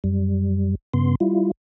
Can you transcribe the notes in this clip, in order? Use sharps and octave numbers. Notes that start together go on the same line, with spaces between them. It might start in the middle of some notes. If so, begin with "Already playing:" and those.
F#2 G3
G2 C#3 B3 C6
G3 E4 F4